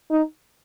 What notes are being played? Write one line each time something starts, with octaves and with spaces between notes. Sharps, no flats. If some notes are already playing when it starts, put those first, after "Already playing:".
D#4